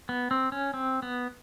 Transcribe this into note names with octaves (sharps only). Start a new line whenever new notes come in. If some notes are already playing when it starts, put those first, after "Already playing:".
B3
C4
C#4
C4
B3